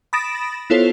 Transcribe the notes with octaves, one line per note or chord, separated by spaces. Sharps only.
B5 D#6 A6 A#6 D7 E7
B3 E4 F4 A4 C5 C#5